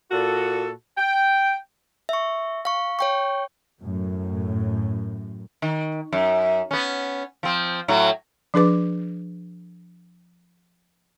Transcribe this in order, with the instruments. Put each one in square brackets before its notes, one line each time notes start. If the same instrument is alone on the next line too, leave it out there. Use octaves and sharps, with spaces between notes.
[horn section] A#2 F#4 A4
G5
[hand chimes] E5 C#6
F5 C#6
C#5 G5 C#6
[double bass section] F#2 A2
[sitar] D#3
F#2
B3 C#4
F3 C4
A2 F#3
[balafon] F3 D4 G#4 B4 D6